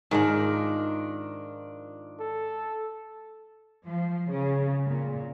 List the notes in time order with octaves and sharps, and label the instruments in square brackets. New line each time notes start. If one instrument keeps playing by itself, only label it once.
[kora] G#2 A#4 [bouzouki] D#3 F3 D4
[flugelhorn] A4
[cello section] F3
C#3
A#2